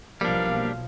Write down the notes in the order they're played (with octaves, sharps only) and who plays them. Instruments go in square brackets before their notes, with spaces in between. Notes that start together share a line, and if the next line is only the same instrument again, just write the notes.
[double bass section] B1 B2 F3 [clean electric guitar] G3 D4 [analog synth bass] A#3 [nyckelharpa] F5